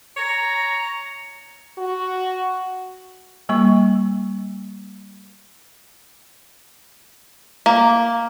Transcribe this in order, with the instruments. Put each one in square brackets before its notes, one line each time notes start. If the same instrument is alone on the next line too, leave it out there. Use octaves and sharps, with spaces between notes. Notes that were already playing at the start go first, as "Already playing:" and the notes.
[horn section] C#5 A#5
[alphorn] F#4
[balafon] G3 A#3 C#6
[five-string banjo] A#3